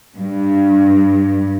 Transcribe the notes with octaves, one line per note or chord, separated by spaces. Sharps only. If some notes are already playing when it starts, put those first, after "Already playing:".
G2